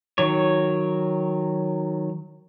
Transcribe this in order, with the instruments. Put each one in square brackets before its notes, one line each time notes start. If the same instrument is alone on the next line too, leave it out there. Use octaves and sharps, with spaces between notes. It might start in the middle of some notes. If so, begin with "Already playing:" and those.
[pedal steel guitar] D#3 F#3 C#5